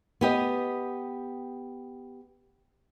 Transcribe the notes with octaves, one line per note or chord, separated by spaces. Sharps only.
B3 G4 D#5